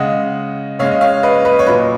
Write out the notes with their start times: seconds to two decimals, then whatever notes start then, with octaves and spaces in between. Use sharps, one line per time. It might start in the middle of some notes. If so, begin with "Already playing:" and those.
Already playing: C#3 G#3 D#5 F#5
0.79 C#3 G#3 C#5 F5
0.91 D#5
1.01 C#5 F5
1.23 B4 D#5
1.45 B4 D#5
1.59 C#5
1.67 A#2 F#3 B4 D#5